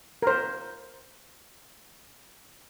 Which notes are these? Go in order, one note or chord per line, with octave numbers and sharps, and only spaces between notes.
A#4 C5